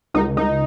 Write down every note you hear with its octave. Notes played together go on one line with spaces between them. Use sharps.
C#2 D#4
C#2 D#4